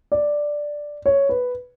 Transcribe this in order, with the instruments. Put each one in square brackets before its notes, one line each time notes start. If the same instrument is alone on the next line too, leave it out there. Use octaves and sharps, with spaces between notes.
[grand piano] D5
C#5
B4